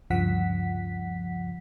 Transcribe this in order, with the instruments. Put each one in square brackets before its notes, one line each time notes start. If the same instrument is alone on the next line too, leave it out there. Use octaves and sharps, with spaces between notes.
[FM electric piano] D2 G2 C#3 F3 F#5 B6